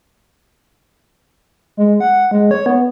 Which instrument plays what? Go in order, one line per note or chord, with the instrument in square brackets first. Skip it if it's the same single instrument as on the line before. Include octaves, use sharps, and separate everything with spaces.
[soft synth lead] G#3
F#5
G#3
C#5
B3